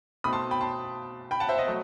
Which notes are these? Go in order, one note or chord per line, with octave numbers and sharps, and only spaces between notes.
B2 A3 C4 D#4 B5 D#6
A5 C6
G5 B5
A5 C6
G5 B5
F#5 A5
C5 E5
D#5 F#5
F#3 A3